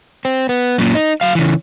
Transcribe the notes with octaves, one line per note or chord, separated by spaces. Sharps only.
C4
B3
F#2 A#2
D#4
F#3 F5
C#3 E3